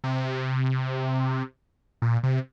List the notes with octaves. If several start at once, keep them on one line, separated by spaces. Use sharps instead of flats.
C3
A#2
C3